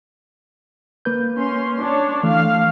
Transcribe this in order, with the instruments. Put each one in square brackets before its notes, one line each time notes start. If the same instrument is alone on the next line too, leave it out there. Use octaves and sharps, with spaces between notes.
[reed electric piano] A#3 B4 G6
[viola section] C#4 C6
D4 C#5
[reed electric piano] E3 A3 [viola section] F5